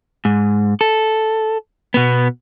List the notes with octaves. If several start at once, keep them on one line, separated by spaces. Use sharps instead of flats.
G#2
A4
B2 B3